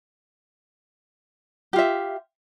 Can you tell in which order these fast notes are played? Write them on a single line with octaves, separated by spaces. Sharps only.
G4 F4 E5